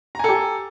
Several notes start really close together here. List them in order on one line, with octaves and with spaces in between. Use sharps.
A#5 G#5 A4 G4